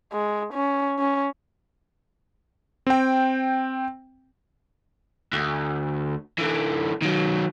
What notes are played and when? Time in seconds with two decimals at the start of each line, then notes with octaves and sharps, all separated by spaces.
0.13 G#3
0.54 C#4
0.99 C#4
2.87 C4 G5
5.33 D2
6.38 D3 E3
7.02 D#3 F#3